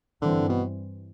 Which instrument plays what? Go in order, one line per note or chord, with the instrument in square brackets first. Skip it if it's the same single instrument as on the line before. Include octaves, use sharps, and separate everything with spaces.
[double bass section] G2 E3 G3 C4 [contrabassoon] D3
[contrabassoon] B2